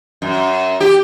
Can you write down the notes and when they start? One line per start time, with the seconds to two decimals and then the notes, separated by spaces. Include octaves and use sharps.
0.22 F#2
0.80 G4